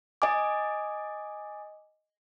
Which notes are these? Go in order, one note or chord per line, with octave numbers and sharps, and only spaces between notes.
D#5 G#5 D6